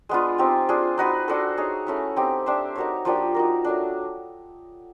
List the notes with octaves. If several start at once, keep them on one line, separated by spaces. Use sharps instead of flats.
G#3 B3 D4 F4
C4 D#4 G4
D4 F4 G#4
D#4 F#4 B4
D4 F#4 A4 C5
D#4 G#4 C#5
A3 C#4 E4
C4 D#4 G4
D4 G4 C5 E5
D#4 F#4 A#4 C#5
F3 A#3 D4 G4
D#4 F#4 A#4
F#3 A3 D4